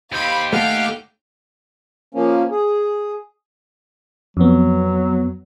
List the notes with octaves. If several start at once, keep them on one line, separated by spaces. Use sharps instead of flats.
D#2 G4 C5 F5 B5
A3 F5 F#5 D6 F6 G6
F3 A#3 C#4
G#4
F2 F#3 B3